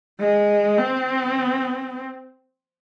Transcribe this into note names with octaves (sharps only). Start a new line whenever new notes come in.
G#3
C4